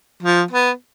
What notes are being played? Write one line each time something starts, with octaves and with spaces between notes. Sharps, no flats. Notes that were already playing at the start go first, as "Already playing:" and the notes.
F3
B3